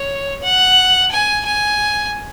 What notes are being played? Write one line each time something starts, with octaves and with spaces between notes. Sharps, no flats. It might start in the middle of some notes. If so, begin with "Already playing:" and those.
Already playing: C#5
F#5
G#5
G#5